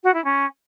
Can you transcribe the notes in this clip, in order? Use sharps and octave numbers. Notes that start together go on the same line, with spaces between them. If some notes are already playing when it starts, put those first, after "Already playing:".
F#4
E4
C#4